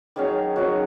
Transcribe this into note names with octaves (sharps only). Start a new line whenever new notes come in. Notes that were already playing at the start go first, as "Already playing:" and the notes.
D#3 F#3 C#4 G#4
D#3 F#3 C#4 F#4